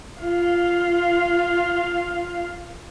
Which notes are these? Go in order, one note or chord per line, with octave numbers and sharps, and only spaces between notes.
F4 F5